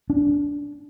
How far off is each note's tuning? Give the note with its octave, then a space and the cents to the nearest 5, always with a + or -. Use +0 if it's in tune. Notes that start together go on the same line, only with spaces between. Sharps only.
D4 -20